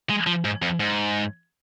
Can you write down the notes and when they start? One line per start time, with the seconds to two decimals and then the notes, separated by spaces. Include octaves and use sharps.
0.10 G#3
0.27 F3
0.45 G#2
0.62 F2
0.80 G#2